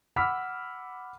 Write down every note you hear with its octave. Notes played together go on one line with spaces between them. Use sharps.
F#5 B5 D6 E6 F6 B6